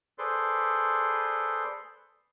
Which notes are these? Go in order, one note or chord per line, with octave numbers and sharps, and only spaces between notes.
G#4 A4 B4 C5 D5 C6